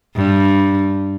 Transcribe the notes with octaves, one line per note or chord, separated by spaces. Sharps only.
G2